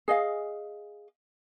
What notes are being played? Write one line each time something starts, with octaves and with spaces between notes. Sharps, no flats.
G#4 D#5 F5